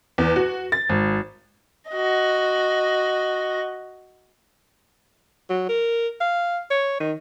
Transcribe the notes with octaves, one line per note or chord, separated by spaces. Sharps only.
E2
F#4
A6
G#1
F#4 D#5
F#3
A#4
F5
C#5
D#3